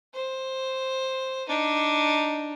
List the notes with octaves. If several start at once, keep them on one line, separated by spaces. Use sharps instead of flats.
C5
D4 D#4